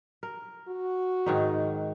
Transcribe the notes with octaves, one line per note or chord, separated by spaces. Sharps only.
A#4
F#4
G#2 D#3 D#4